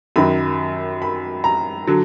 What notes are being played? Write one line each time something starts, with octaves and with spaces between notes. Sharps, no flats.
F#2 D#3 F#3 B5
B5
A#5
D3 F#3